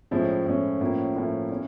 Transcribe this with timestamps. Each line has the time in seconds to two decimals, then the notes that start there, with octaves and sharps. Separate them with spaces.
0.11 A2 F3 G#3 C#4 E4
0.46 A2 F3 G#3 C#4 E4
0.81 A2 F3 A#3 C#4 E4
1.16 A2 F3 A#3 C#4 E4
1.50 C#4 E4